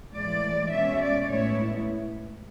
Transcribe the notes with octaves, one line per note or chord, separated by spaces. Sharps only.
A2 E3 G#3 D5
B2 G#3 C#4 E5
D5
A2 G#3 B3 E4 C#5